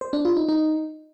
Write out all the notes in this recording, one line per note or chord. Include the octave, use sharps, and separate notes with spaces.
C5
D4
F4
D#4
D#4